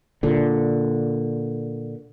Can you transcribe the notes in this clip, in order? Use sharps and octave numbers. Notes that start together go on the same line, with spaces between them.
A#2 D3